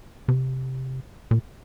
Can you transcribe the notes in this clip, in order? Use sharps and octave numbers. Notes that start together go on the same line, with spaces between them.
C3
A#2